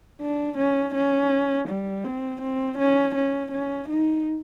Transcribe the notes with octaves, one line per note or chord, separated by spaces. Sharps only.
D4
C#4
C#4
G3
C4
C4
C#4
C#4
C#4
D#4